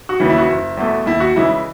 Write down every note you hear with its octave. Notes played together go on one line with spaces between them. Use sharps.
F#4
D#2 C#3 E3
E4
F#4
F#1 E4
E2 B2 A3
D#2 E4
F#4
C#3 E3 G#3 E4